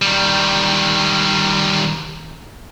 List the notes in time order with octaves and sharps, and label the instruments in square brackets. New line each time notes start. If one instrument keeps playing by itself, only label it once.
[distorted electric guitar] D#3 G3